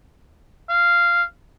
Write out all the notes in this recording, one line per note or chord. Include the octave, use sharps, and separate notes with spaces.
F5